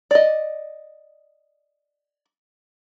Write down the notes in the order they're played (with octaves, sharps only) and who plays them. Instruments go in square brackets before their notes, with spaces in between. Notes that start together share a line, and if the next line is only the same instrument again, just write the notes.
[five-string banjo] D5 D#5